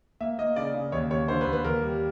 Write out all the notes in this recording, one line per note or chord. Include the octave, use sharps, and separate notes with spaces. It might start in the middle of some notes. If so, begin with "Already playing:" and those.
A#3 E5
A#3 D#5
C#3 D5
C#3
D#2 C#5
D#2 C#5
D3 C5
B4
D#2
B4
D#2 A#4
G3